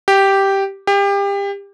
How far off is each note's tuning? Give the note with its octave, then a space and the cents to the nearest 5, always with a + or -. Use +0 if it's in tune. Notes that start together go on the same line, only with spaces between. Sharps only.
G4 -5
G4 +30